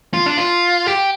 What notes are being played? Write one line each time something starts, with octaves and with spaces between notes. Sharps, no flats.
F4
D4
F4
G4